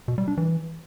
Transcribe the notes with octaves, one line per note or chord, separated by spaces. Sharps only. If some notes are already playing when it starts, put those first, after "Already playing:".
B2
G3
D4
E3